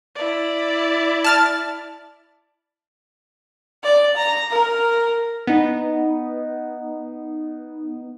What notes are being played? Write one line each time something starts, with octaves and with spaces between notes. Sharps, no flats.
E4 D5
A5 F6 A6
D5
A#5
A#4
B3 D#4